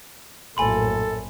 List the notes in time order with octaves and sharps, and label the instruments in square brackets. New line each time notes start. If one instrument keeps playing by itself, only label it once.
[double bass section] A#1 F#2 A2 [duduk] A4 [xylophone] G#5 B5 C6